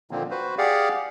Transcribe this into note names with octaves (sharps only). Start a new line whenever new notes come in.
A#2 D3 D#3 F3 A#3 C4
F#4 B4 C5
G4 G#4 D5 F5 F#5